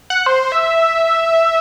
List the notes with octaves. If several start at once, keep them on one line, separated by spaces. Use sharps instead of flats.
F#5
C5
E5